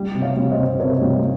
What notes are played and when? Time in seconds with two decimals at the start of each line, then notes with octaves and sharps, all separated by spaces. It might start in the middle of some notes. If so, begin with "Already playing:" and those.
Already playing: G3
0.15 C3
0.22 C#5 F5
0.36 G3
0.51 C5 D#5
0.58 C3
0.80 C3 A#4 C#5
1.01 G3